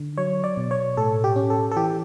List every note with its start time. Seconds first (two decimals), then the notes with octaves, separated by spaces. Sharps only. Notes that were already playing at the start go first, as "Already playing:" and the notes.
Already playing: D3
0.17 F#3 C#5
0.44 D5
0.57 B2
0.71 C#5
0.97 A2 A4
1.24 G4
1.36 C#4
1.50 A4
1.71 A4
1.76 E3 G4